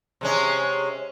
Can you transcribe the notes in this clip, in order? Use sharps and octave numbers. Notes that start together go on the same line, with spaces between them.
C3 G#3 C#4